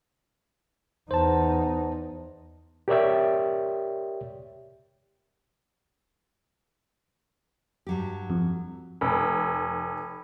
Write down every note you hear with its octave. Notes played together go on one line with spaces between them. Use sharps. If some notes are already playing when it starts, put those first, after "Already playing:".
E2 D#4 C5 A5
G4 A#4 C#5 D5 E5 G5
G2 F#3 G4
F2
F1